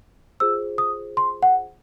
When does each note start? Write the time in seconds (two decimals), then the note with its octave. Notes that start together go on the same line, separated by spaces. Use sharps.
0.40 F4 G#4 C5 E6
0.78 D#6
1.17 C6
1.43 F#5